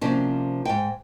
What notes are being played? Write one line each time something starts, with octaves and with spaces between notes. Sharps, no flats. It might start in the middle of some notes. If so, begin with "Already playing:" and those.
C3 F3 A#3 C#4 D4
G#2 G5